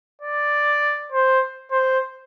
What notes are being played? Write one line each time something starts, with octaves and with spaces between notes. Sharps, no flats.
D5
C5
C5